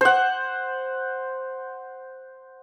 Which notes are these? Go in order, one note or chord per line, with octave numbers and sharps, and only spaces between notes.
C5 F#5